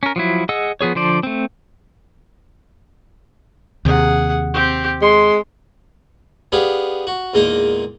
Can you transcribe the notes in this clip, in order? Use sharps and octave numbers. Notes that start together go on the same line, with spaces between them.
C#4 A#4
F3 F#3 E4
G#4 D#5 F#5 E6
F3 B3 G#4 C#5
D3 F3 C5 D5
A3 C4
D#2 C3 G#4 F#5
C4 G4
G#3 C6
B3 D4 G4 G#4 F5
F#4
E2 A#2 G#3 A#3 D#4